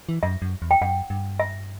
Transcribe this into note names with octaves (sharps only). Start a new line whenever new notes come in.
E3
F#2 E5
F#2
E2
G5
F#2 F#5
G2
E5